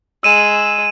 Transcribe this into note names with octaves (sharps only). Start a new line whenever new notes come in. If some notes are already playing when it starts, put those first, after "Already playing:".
G#3 E6 D#7 E7